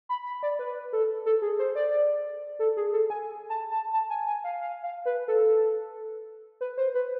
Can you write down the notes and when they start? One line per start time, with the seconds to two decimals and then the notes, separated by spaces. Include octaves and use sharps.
0.09 B5
0.26 B5
0.43 D5
0.59 B4
0.93 A4
1.26 A4
1.42 G#4
1.59 C5
1.75 D5
2.59 A4
2.77 G#4
2.93 A4
3.10 G#5
3.49 A5
3.71 A5
3.94 A5
4.10 G#5
4.27 G#5
4.44 F5
4.61 F5
4.83 F5
5.06 B4
5.28 A4
6.61 B4
6.77 C5
6.94 B4